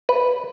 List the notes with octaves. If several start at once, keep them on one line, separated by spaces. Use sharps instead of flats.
B4